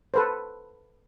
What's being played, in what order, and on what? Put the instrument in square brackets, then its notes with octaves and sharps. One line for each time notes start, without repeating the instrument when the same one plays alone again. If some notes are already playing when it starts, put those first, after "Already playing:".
[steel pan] A4 B4 C5